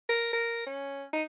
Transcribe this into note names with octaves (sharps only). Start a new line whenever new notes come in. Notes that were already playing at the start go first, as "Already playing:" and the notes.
A#4
A#4
C#4
D#4